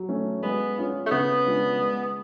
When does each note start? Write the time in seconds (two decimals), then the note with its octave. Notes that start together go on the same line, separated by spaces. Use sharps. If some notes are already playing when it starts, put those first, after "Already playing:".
Already playing: F#3
0.09 A3 C#4
0.43 G#3 B3
0.77 C#4 F4
1.06 A3
1.11 C#3 B3
1.45 G#3 D4 F4
1.80 G#3